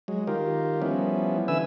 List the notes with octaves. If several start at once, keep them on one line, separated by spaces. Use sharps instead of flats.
F#3 G#3
D#3 F4 G4 A#4
F3 G3 B3 C#4 E4
D3 E3 B4 E5 G#5 E6